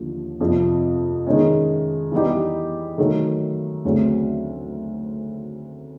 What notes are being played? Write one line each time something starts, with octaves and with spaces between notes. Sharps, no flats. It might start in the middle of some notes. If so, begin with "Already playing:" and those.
Already playing: D#2 D3 F3
F2 C3 F3
D#3 G#3 C#4
E3 G3 B3 D#4 G4
D#3 F#3 A3
D2 C#3 F#3 A3 C4